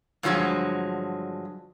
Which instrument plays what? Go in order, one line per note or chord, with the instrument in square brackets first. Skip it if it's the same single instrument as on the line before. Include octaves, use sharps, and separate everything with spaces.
[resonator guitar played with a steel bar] G2 D3 F3 F#3 G#3